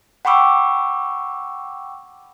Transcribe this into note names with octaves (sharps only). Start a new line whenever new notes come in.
F#5 G5 B5 C#6 D6 E6